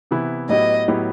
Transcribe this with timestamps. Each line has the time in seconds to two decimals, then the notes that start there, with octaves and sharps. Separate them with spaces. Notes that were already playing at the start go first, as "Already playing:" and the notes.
0.11 C3 E3 B3 E4
0.49 A2 F#3 B3 E4 G4 D#5
0.88 A2 F#3 B3 E4 G4